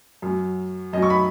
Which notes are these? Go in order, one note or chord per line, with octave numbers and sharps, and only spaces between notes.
F#2 F#3
F#2 F#3 D#5
C#6
B5